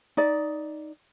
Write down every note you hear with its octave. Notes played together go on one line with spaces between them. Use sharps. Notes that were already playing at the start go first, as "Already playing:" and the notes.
D#4 D5